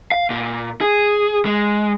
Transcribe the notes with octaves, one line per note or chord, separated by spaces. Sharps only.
F5
A#2
G#4
G#3